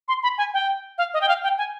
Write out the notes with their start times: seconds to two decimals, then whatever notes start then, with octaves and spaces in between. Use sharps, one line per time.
0.08 C6
0.23 B5
0.38 G#5
0.54 G5
0.98 F5
1.14 D#5
1.21 G5
1.29 F5
1.43 G5
1.58 G#5